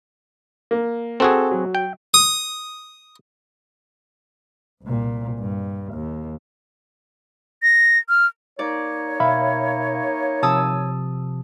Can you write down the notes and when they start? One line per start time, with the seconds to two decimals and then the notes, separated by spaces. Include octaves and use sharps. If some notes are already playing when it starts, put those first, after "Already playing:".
0.71 A#3
1.20 C4 F#4 G#4 A4
1.51 F#3
1.75 G5
2.14 D#6
4.83 C2 A#2
5.39 G2
5.94 D#2
7.63 A#6
8.09 F6
8.59 A#3 D#4 C#5 D5
9.20 B2 E5 F5 B5
10.43 C3 F3 A5 D#6 E6